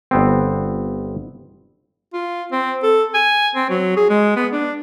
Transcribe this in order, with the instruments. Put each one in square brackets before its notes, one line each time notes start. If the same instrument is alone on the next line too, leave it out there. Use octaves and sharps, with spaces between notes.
[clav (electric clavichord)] G1 B3 C4
[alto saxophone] F4
C4
A4
G#5
C4
F#3
G#4
G#3
B3
D4